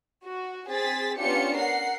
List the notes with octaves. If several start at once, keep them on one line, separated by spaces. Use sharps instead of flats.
F#4
C4 G#4 A6 B6
B3 C#4 D4 F4 G4 C#7
A#4 F#5 C7